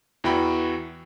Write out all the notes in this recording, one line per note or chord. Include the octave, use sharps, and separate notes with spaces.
E2 E3 F#4 G5 B5